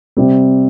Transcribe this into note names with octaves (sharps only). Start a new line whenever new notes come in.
C3 G3 C4